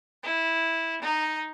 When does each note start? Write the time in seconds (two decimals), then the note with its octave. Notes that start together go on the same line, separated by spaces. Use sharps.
0.23 E4
1.02 D#4